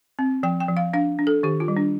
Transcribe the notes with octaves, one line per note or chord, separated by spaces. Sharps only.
C4
F3 G5
G5
F3
F5
D4 F5
D4
A4
D#3 G4
F4
G3
D4